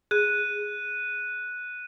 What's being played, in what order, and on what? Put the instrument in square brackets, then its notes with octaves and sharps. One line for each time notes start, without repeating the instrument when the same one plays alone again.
[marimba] G#4 [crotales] F#6 D#7